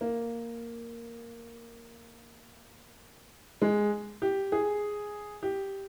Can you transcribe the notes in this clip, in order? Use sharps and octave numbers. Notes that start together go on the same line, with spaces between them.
A#3
G#3
G4
G#4
G4